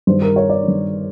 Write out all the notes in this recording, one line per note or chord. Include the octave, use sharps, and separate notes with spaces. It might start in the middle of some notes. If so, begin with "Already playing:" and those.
G2 D#3 C5
A#4
C#5
D5
G2 D#3